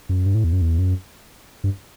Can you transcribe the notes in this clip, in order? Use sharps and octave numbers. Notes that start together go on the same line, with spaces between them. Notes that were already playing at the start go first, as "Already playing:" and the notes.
F#2
G2
A2
E2
F#2
E2
F#2
G2